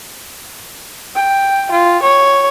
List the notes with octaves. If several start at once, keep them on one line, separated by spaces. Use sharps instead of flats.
G5
F4
C#5